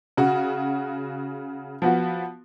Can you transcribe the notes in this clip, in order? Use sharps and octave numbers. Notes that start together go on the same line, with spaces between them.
C#3 F#4
F3 B3 F#4